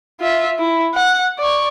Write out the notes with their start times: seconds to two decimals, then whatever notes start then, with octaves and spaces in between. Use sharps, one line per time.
0.21 F4 E5
0.59 E4
0.95 F#5
1.38 D5 C#6